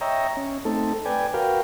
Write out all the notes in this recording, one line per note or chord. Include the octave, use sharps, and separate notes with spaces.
C#5 D#5 E5 G5 A#5
C#4
A3 C4 D#4 A4
B4 D5 G5 G#5
F#4 A#4 B4 F5 G5